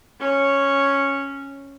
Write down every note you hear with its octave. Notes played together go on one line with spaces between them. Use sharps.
C#4 C#5